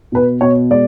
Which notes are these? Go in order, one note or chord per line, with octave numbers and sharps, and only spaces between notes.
B2 B4
B2 C#5
G#3 D5